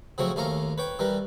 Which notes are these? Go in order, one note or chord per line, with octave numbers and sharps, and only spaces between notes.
C#3 F3 F#3 A3 C4 C#5
D#2 A3 C#4 F5 A#5
B4 C#5 G5
E3 G3 A#4 B4